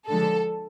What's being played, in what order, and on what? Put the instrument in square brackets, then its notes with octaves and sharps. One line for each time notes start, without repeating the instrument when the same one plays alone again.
[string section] D3 F3 G#3 A4